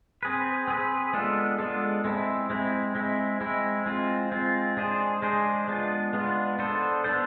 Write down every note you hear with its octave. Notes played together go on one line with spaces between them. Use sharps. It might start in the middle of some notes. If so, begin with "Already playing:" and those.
C4 G#4 B4
C4 G#4 B4
G#3 B3 D4 F4 A4
G#3 B3 D4 F4 A4
G#3 C4 E4
G#3 C4 E4
G#3 C4 E4
G#3 C4 E4
G#3 C4 F4
G#3 C4 F4
G#3 D4 G#4 C5
G#3 D4 G#4 C5
G#3 B3 D4 F4
G#3 B3 D4 F4
B3 D4 A4 C5
B3 D4 A4 C5